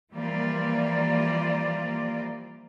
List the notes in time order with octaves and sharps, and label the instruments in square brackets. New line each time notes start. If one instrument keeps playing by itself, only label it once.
[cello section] E3 F3 G3 A#3 F4 D5